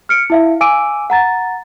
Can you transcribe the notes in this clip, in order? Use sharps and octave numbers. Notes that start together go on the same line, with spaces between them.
F6 C#7 D7
E4 E5 F5
F5 G#5 D6 E6 D7 D#7
F#5 A#5 A6